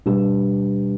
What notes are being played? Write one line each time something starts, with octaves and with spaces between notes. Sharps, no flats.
B2 G3 D4 G4 B4